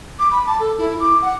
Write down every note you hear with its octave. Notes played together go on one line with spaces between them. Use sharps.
D6
B5
A5
A4
E4
D6
F#5